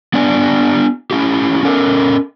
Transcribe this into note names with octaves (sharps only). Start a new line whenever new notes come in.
B3 D4 G4 D5 G#5
C#4 E4 G4
C#4 A4 A#4